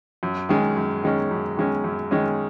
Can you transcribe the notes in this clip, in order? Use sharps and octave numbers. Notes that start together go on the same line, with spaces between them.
F#2
D#3 G#3 C#4
F#2
D#3 G#3 C#4
F#2
D#3 G#3 C#4
F#2
D#3 G#3 C#4